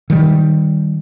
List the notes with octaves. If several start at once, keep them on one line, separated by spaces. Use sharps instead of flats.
D#3 G3